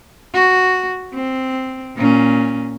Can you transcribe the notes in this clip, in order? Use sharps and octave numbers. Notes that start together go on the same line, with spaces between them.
F#4
C4
A#2 C#4